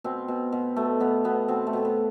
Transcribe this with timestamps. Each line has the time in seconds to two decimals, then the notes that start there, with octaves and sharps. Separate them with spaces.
0.04 B2 C4
0.28 B2
0.52 B2
0.76 B2 A3
1.00 B2 B3
1.24 B2 B3
1.48 B2 C4
1.67 A3
1.73 B2
1.85 B3